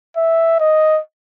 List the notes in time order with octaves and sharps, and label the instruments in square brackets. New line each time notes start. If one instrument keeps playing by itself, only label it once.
[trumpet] E5
D#5